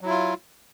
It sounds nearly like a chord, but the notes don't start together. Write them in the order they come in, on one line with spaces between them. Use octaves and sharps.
F#3 E4 F4